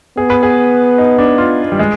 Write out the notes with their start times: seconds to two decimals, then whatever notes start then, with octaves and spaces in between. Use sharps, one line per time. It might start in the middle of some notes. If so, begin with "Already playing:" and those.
0.17 B3 G#4
0.30 B4
0.43 G#4
0.98 D#4
1.18 D4
1.38 F4
1.72 G3
1.79 G#3